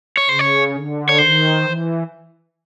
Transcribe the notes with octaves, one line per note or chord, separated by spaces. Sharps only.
C#5
C#3 C5
C#5
D3
C#5
D#3 C5
E3